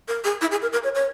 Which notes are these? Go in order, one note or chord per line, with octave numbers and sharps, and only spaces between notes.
A#4
G#4
E4
G#4
A#4
A#4
C#5
C#5